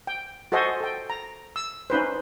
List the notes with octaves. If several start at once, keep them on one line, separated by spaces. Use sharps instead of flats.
G5
F#4 A4 C5 D#5 G#5
A4 G5
A#5
E6
C#4 D#4 B4 C5